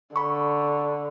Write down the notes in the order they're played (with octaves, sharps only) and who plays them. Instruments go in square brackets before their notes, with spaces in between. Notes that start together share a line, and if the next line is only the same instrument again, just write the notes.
[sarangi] D3 [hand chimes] B5 C#6